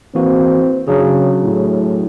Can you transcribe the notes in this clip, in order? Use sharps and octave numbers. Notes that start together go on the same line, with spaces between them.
E3 A#3 C4 F#4
C#3 F#3 D4 G#4
A2